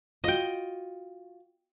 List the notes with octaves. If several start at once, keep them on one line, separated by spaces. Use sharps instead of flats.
F4 F#4 D#5 G5